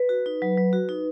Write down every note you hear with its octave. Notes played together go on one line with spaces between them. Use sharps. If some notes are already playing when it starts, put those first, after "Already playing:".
Already playing: B4
F#4
D#4
F#3
F#3
F#4
D#4